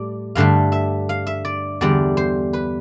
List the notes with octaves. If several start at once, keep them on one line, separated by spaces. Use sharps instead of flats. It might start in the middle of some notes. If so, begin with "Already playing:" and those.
Already playing: A2 G3 D5
G2 D3 A3 F5
E5
F5
E5
D5
E2 D3 G3 D5
C5
B4